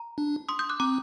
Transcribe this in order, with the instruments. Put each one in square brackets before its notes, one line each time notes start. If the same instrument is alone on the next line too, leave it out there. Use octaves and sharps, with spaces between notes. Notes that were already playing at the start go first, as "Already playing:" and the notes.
Already playing: [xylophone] A#5
[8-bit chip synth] D4
[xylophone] C6 D#6
D#6 G6
D6 F#6
[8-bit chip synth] C4 [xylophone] A#5 D6